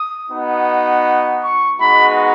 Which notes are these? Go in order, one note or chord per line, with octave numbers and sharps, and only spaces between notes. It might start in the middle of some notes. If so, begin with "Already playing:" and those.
Already playing: D#6
B3 D#4 F#4
C#6
G#3 B3 D#4 F#4 B5